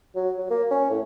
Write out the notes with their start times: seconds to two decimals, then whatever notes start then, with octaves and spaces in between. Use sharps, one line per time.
0.16 F#3
0.38 F#3
0.50 A#3
0.71 C#4
0.90 A2